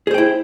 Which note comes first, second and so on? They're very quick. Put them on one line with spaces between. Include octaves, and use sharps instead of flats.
G#4 C5 G5 E4